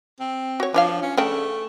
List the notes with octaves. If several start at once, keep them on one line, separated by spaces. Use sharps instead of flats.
C4
F#4 C#5
F3 D4 C#5 F5
C#4
C#3 A3 D4 G5